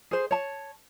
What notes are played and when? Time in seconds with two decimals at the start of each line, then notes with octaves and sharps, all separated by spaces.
0.11 G#4 C5
0.31 C#5 A5